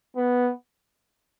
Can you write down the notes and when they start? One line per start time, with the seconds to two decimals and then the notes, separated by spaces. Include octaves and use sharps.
0.17 B3